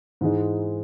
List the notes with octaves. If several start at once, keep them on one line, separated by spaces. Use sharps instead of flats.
G#2 E3 G#3 D#4